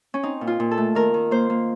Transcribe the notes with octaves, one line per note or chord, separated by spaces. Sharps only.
C#4
C4 D#4
A#2
F4
A#2
A4
A3
D#3 A#4
D#3
A#3 C5
A#3